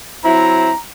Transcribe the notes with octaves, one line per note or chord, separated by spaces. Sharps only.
F#3 C4 E4 A#5